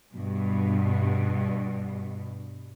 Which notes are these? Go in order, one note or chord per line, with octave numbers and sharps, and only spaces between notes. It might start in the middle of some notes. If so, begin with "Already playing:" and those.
G2 B2